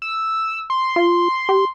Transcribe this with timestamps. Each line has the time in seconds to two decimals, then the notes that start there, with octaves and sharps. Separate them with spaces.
0.02 E6
0.70 C6
0.96 F4
1.49 G4